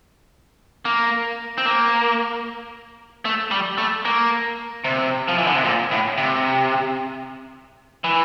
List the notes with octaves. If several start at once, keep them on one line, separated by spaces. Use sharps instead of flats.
A#3
C4
A#3
A3
G3
A3
A#3
C3
F3
E3
D3
C3
A#2
A2
C3
E3